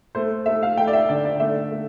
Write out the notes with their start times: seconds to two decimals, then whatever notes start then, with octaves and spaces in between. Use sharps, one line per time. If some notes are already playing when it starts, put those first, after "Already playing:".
0.15 A3 C5
0.46 A3 E5
0.63 F5
0.77 A3 G5
0.87 D5
0.93 E5
1.09 D3 D5
1.25 D5
1.40 A3 E5
1.72 A3